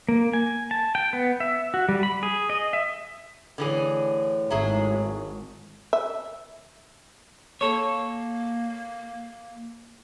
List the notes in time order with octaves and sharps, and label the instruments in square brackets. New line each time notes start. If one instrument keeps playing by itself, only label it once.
[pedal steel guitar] A#3
G#5
A5
G5
B3
E5
F#4
G3
B5
G#4
D#5
E5
[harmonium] A2 [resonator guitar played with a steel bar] D3 E3 G#4
[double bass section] G#1 [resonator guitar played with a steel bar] F#3 E4 G#4
[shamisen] E5
[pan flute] A#3 [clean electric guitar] A4 C#5